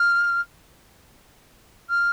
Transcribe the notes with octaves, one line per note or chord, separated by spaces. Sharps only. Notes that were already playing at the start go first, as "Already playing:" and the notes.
Already playing: F6
F6